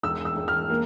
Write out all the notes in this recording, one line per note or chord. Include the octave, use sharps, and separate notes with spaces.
E1 E6
E6
E1
F6
A#3